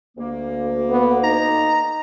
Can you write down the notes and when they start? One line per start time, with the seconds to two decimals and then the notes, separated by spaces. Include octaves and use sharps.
0.17 D2 A#3
0.89 B3
1.23 D#4 A#5